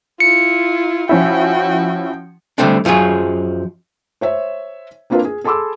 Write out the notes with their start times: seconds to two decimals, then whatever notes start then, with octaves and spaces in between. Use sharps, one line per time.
0.20 E4 F4 C#7
1.09 F3 C#4 E4 F#4 G5
2.58 D3 G3 A3 C4 D4
2.85 F#2 F3 F#3 F4 G#4
4.21 C5 C#5 E5
5.10 A#3 C4 D4 F4 A#4 B4
5.25 G#4
5.44 G#4 A4 B5 C6 D6 E6